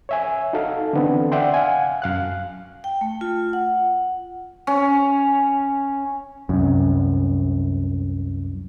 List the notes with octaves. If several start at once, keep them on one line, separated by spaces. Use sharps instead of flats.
C#5 E5 G#5
D#4 F#4 A4 F5
D3 E3 B3 C4
D5 E5 F#5 G5 C6
F5 F#5 G#5
F#2 F5 F#6
G5
A3
F4
F#5
C#4
C2 F#2